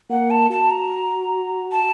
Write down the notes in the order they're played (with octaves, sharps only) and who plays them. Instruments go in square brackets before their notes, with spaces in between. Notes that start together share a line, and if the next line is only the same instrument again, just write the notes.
[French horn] A#3 [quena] F#5
[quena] A5
[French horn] F#4 [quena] A5
[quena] A#5
A5